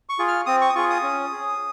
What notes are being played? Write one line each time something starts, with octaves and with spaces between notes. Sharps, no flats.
C#6
F4 G#4
F6
C4 D#6
C#6
D#6
F4 G#4 C#6
D#6
C#4
G#4